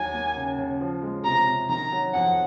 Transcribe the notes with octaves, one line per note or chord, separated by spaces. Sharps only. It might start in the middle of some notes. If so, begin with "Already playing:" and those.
Already playing: D#2 F#3 G#5
A#3
C#3
C#3
F3
G#3
C3 A#5
C3
D#3 A#5
F#3
F2 F#5